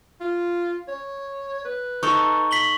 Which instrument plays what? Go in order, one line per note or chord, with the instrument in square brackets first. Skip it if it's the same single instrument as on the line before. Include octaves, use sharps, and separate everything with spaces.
[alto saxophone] F4
C#5
B4
[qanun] D#4 A4 [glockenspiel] C#6
[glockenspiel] B6 F#7 G7